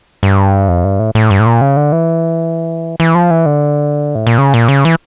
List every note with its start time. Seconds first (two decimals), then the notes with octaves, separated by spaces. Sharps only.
0.23 G2
0.68 F2
0.84 G2
0.99 A2
1.15 A2
1.30 G2
1.40 A2
1.46 A#2
1.61 C#3
1.77 D3
1.92 E3
3.00 E3
3.15 F3
3.30 E3
3.46 D3
4.15 A2
4.27 A#2
4.38 C#3
4.54 A#2
4.69 C#3
4.85 E3